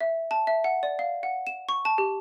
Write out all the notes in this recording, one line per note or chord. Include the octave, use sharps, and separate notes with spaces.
E5
A5
E5
F#5
D5
F5
F#5
E7
C#6
A5
G4